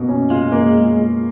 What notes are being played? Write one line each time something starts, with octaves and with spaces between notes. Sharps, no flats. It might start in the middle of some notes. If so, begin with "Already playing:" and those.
Already playing: B2 A#3
C#4
G#3 F4
A#3